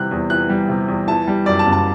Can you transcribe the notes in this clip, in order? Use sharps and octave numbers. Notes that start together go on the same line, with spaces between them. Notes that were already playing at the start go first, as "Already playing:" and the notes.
Already playing: C3 E3 G3 F#6
E2
E3 F#6
G3
C3
E2
E3 A5
G3
F#2 D5
A5
F#1
A5